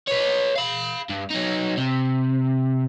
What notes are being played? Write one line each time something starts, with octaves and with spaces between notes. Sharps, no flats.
B4 C#5
F5 B5
G2
F#3 D#4
C3